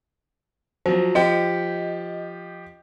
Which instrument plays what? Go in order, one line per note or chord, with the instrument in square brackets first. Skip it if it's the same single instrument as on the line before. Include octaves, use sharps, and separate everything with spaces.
[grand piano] F3 F#3 [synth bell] C5
[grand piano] F3 G4 [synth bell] D#5